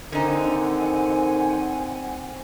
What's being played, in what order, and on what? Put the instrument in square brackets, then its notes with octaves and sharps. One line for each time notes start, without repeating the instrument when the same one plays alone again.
[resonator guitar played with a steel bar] D3 D#4 [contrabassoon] D#3 [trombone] C4 [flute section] F#5 G#5